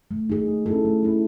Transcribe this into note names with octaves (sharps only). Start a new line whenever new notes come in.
A3
D#4 G#4
A3
C#4 E4 A4
A3
C#4 E4 A4